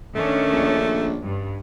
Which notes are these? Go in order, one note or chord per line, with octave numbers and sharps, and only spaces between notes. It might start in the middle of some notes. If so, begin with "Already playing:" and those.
D#3 A3 C#4 D4
A#1
G2